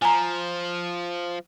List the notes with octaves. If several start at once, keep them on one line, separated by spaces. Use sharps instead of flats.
F3 G#5 A#5